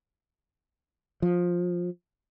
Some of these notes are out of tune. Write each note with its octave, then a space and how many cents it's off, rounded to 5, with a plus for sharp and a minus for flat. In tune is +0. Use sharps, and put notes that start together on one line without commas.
F3 +15